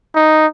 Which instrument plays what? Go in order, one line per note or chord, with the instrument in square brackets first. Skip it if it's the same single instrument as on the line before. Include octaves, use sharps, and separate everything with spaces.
[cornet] D#4